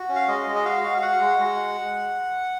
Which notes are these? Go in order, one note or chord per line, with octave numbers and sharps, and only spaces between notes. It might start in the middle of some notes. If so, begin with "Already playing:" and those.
Already playing: F#4
C#4
F5
G#3 D#5
G#3
D#5
F#4 F5
F#4
F5
F#4 F#5
G#3
G#3